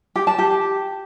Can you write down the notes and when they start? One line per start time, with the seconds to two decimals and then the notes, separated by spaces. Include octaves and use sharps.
0.16 G4
0.27 A5
0.38 G4